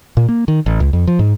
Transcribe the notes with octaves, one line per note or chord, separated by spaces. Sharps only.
A#2
A#3
D#3
A1
C#2
F2
F3
G#2